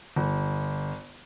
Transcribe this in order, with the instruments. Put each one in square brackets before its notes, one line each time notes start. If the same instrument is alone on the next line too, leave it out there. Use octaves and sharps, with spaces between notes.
[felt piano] G1